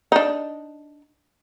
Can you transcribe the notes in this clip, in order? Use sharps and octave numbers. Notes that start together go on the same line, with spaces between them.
D4 D#4